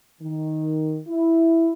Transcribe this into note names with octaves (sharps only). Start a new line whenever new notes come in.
D#3
E4